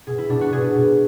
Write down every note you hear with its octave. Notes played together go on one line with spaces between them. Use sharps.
B2 G#4
E4
B2 D4
F#4
B2 G#4
B2